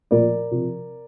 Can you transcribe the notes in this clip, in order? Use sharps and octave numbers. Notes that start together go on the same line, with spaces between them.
A#2 F3 A#4 D5
C3 F3